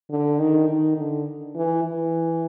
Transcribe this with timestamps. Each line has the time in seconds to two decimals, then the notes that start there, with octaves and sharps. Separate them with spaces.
0.10 D3
0.39 D#3
0.68 D#3
0.97 D3
1.55 E3
1.84 E3